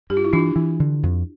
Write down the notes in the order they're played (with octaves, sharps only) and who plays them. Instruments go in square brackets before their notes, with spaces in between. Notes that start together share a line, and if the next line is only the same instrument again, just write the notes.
[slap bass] G2 [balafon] G4
[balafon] F4
E4
[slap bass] E3 [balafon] D4 F4
[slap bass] E3
D3
F2